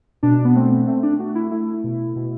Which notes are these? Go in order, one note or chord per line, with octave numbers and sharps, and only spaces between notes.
B2 D4
B3
A3 C4
A3 C4
D4
A3 F#4
E4
A3 E4
B2
B2